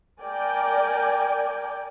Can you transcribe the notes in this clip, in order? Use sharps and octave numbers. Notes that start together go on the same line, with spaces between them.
A#4 D5 G5 G#5